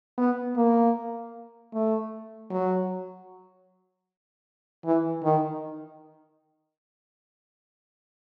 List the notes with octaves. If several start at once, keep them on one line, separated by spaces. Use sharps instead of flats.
B3
A#3
A3
F#3
E3
D#3